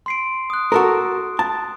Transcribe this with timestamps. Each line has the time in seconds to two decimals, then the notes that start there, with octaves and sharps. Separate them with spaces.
0.06 C6 C7 D7
0.50 D#6 F#6
0.72 F#4 A4 A#4
1.39 A5